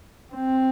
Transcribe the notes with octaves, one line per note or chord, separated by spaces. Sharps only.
C4